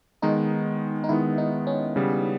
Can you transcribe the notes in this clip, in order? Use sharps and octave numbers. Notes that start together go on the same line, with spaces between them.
D#3 G#3 B3 D#4
D#4
D#3 G#3 B3 E4
D#4
C#4
C#3 G3 B3